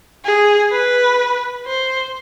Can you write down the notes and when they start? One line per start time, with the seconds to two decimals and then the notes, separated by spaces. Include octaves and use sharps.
0.25 G#4
0.72 B4
1.66 C5